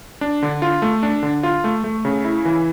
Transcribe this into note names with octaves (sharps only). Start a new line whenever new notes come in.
D4
D3
F4
A3
D4
D3
F4
A3
A3
C#3
E4
E3